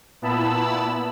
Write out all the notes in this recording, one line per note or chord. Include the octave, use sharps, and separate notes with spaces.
A#2 B3 E4 A5 B5 E6